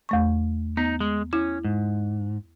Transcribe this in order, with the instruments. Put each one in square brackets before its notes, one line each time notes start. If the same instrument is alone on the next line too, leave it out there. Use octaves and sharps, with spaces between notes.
[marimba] E2 A3 C#6
[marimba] B3 [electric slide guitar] D#4
[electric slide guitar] G#3
[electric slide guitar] C#4 [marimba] E4
[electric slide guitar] G#2